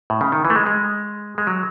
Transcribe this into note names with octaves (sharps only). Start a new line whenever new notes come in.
A2
C#3
D#3
E3
A3
G#3
G#3
G#3
F#3